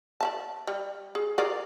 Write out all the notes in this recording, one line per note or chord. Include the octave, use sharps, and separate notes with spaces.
D5 E5 A5
G3
G#4
G#4 A#4 D5